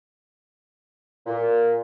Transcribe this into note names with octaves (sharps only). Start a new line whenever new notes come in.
A#2